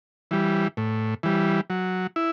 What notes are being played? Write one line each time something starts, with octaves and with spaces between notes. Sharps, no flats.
E3 G3
A2
E3 G3
F#3
E4